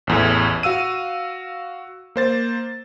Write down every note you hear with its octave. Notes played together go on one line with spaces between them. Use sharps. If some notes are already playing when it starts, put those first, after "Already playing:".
A1 E2 A2
F#4 F5 E6 D#7
A#3 C5 A6